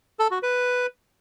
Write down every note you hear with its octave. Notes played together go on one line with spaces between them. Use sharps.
A4
F#4
B4